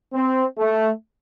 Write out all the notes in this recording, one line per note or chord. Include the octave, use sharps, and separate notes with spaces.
C4
A3